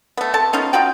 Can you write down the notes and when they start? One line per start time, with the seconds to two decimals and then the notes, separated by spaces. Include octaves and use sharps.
0.17 A3 B3
0.34 C3 A4 A5
0.53 B3 C#4 D#4 F4
0.73 D#4 F4 F#4 G5